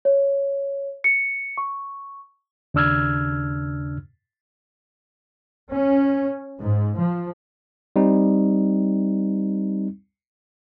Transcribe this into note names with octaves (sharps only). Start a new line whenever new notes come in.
C#5
C#7
C#6
D#2 C#3 D4 E6 F6 G#6
C#4
G#2
F3
G3 C4 D#4